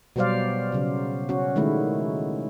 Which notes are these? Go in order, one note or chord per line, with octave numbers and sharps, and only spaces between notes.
B2 F#3 G3 C5 D5 F5
C#3 F#3
C#4 F#4
D#3 G#3 A3 E4